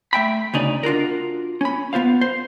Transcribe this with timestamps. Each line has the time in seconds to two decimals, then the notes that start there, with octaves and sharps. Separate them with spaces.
0.13 A3 E5 G5 B5
0.54 D2 C#3 D#4 D5
0.83 D4 F4 F#4 A#4
1.61 C#4 B5
1.93 B3 F4 C5 F5
2.21 C5